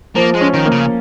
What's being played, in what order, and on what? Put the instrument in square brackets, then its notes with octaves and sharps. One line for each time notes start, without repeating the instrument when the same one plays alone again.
[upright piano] F3 [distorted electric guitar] A#3
[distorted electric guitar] G#3
[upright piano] C#4
[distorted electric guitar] D#3
[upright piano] A#3
[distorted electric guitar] C#3